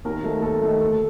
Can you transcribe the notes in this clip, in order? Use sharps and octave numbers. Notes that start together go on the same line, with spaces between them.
D#2 A#4
D#3 A3
D#2 A4
D#3 A3
D2 A4